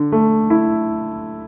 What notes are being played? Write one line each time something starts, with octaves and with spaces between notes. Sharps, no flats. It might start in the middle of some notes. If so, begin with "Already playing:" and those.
Already playing: D3
A3
E4